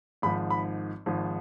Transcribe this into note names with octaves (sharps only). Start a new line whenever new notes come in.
G#1 G#2 F3 B5
B5
G#1 G#2 F3